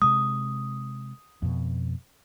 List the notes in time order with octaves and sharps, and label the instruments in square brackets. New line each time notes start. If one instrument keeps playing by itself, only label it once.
[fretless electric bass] C3 G#3 [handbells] D#6
[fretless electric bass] F2 B2